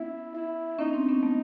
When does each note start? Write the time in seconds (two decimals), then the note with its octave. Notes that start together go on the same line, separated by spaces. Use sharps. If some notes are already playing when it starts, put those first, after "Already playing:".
Already playing: B3 C#4 E4
0.35 E4
0.79 B3 C#4 D#4
0.93 C4 D4
1.08 B3 C#4
1.23 A3 B3